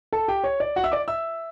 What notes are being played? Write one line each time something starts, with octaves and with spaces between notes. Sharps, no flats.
A4 A5
G4 G5
C#5
D5
F#4 F#5
E5 E6
D5 D6
E5 E6